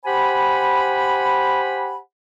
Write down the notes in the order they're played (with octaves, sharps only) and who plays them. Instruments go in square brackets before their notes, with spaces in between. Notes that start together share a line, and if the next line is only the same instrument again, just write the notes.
[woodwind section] G4 C5 F#5 G#5 B5